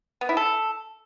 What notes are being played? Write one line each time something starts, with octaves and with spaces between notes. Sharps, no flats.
B3
E4
A4